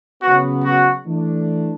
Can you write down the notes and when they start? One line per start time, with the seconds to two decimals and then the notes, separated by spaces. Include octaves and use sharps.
0.22 C#3 F#3 B3 F#4
0.64 F#4
1.05 E3 A3 D4